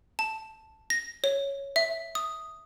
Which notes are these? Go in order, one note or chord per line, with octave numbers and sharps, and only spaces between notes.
A5
A#6
C#5
E5
D#6